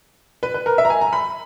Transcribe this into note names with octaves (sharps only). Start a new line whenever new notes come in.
B4
B4
A#4
E5
A#5
G#5
A#5
B5